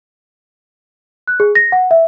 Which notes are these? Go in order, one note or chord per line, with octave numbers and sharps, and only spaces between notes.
F#6
G#4
A#6
F#5
E5